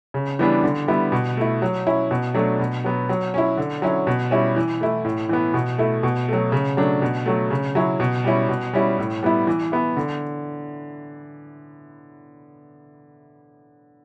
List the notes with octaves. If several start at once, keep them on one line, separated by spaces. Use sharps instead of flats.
C#3
E3 G3 B3 D4
D3
G3 B3 E4
B2
A3 E4
F#3
C#4 E4
B2
F#3 A3 D4
B2
F#3 B3
F#3
C#4 E4
D3
F#3 C#4 E4
B2
G3 C#4 E4
E3
A3 E4
A2
E3 B3
B2
A3 E4
B2
F#3 A3
C#3
F#3 A3 D4
B2
F#3 A3
C#3
F#3 C#4 E4
B2
G3 C#4 E4
B2
G3 C#4 E4
A2
G3 B3 E4
E3
B3 E4
D3